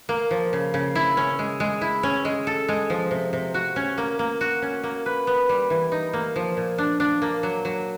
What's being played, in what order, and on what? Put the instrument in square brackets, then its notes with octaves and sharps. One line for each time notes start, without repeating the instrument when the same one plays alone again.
[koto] A#3
F3
C#3
C#3
E4
C#4
G#3
G#3
E4
C#4
G#3
A4
G#3
F3
C3
C3
F#4
C#4
A#3
A#3
F#4
C#4
A#3
B4
B3
G3
E3
D#4
A#3
F3
A#2
D4
D4
A#3
F#3
F#3